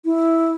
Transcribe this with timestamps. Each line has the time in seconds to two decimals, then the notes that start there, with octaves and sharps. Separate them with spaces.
0.05 E4